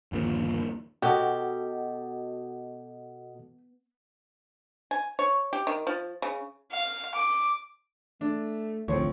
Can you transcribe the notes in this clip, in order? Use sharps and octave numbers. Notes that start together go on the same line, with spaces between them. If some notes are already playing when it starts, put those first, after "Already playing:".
G1 D#2 A#2 F3
B2 F#4 G4 A4 D#5
G#5
C#5
G4
D#3
F3
C#3
F5
D6
A3 D4
A1 D2 F3 C4 F4 C#5